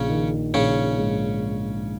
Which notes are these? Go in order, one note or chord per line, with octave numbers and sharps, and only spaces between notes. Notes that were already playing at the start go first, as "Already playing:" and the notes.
Already playing: A#1 C#3 C#4
D#3
A#1 C#3 C#4
G#2